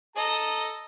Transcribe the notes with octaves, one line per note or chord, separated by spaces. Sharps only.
A4 D#5 A#5